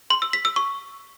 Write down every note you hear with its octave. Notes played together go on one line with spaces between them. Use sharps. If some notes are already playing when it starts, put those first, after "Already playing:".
C6
E6
B6
E6
C#6